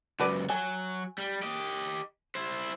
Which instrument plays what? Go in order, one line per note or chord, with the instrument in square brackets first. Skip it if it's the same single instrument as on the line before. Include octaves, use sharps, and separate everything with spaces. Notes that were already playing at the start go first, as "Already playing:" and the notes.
[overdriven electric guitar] C#2 F#2 [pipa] F#4 B4 D5
[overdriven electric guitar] F#3 [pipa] G#5
[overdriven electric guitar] G3
G4 D#5
E4 C5